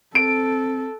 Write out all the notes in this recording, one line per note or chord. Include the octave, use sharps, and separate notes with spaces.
C4 A4 D7